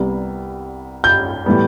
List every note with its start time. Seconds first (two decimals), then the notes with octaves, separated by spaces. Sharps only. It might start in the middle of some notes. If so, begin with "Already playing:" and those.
Already playing: C2 C3 G3 B3
1.04 G6
1.46 A2 E3 G3 B3